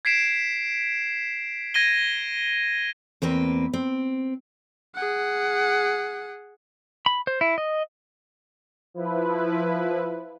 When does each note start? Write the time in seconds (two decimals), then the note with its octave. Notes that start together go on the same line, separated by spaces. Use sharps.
0.05 G#6 B6 C7 D7 E7
1.74 G#6 A#6 D#7 G7
3.22 E2 A#3 C4 B4
3.73 C4
4.95 G#4 F#5
7.06 B5
7.27 C5
7.41 E4
7.58 D#5
8.94 F3 E4 B4